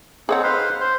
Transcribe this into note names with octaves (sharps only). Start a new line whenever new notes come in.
C4 D#4 G#4 C#5 F#5
B4 C5 F5
C5